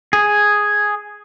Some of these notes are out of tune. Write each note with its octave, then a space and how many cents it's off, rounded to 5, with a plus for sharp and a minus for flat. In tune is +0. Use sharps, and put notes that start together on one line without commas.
G#4 +0